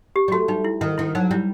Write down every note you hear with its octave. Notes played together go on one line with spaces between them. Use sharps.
G4
G3
A3 F#4
G3 D#4
E4
D#3 E4
D#3 E4
F#3 D#4
G3 E4